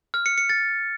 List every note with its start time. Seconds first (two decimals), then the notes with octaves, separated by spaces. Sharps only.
0.14 F6
0.26 C#7
0.38 C#7
0.49 A6